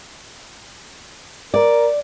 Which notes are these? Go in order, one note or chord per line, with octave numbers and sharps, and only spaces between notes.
A#4 D5